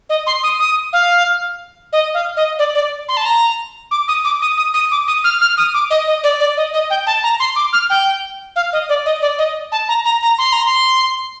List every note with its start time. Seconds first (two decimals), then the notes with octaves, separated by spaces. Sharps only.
0.09 D#5
0.26 C6
0.43 D#6
0.59 D#6
0.93 F5
1.92 D#5
2.14 F5
2.36 D#5
2.59 D5
2.75 D5
3.08 C6
3.17 A5
3.25 A#5
3.91 D6
4.08 D#6
4.24 D6
4.41 D#6
4.57 D#6
4.74 D#6
4.91 D6
5.07 D#6
5.24 F6
5.40 F6
5.57 D#6
5.74 D6
5.90 D#5
6.07 D#5
6.23 D5
6.40 D5
6.57 D#5
6.73 D#5
6.90 G5
7.06 A5
7.23 A#5
7.40 C6
7.56 D6
7.72 F6
7.89 G5
8.56 F5
8.72 D#5
8.89 D5
9.05 D#5
9.22 D5
9.38 D#5
9.72 A5
9.88 A#5
10.05 A#5
10.22 A#5
10.38 C6
10.52 A#5
10.65 C6